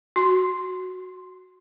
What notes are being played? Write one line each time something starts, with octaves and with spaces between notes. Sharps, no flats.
F#4 C6